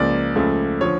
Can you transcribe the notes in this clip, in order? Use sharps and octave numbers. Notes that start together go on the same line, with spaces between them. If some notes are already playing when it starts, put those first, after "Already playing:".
Already playing: C#2 C#3 F3 A#3 D5
C#2 C#3 F3 A3
D3 F3 C#5